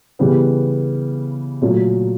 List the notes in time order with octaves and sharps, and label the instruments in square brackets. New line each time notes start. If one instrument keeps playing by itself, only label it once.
[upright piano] C#3 E3 G3 B3
A#2 F#3 A3 C#4